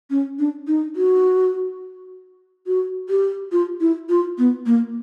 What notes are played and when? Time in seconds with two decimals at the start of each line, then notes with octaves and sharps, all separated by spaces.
0.10 C#4
0.39 D4
0.67 D#4
0.96 F#4
2.67 F#4
3.09 G4
3.52 F4
3.80 E4
4.09 F4
4.38 B3
4.66 A#3